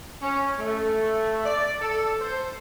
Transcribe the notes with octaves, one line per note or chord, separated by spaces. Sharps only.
C#4
A3
D5
A4
C5